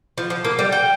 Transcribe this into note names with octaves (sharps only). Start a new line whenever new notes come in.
F3
F3
A#3
G3
G5